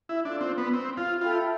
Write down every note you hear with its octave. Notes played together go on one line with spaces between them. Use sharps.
E4
D4 F4 A4 D5
C4
B3
C4
F4
F4 A4 E5 G5 B5